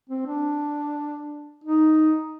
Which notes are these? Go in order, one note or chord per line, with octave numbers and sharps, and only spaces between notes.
C4
D4
D#4